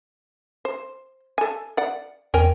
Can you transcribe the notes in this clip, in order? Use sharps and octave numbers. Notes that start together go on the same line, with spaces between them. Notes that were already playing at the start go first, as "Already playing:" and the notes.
C5
A4 G#5
D5 F#5
E2 A#4 G5 G#5